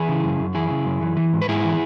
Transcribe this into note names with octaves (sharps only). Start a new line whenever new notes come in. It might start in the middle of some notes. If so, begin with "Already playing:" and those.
Already playing: E3 E4 G#4
C#3
F#2
F#2
E3 E4 G#4
C#3
F#2
E3
E3
G#2
B4
G#2 E4 G#4
E3